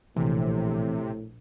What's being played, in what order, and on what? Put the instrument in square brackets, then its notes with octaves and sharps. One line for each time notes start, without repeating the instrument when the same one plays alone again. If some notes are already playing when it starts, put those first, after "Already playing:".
[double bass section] A#1 [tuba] A2 [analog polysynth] C3 [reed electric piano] E3